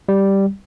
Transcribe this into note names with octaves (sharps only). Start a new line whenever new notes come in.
G3